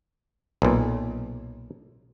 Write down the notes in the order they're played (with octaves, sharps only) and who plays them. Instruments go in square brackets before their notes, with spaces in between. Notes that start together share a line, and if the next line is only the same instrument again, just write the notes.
[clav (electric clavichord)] B1 A#2